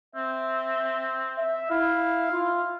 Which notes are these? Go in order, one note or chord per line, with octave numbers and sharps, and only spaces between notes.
C4 E5
E5
E4 F5
F4